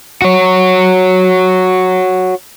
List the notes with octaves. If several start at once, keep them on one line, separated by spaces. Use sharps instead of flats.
F#4 C#5